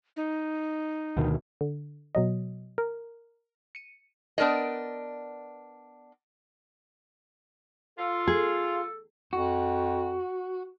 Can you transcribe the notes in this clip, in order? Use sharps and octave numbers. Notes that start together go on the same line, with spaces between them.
D#4
D2 B2 D#3
D3
B2 F#3 D#5
A#4
C#7 D#7
B3 D4 A#4 D5 D#5
F4 A4
G#4
F2 F#4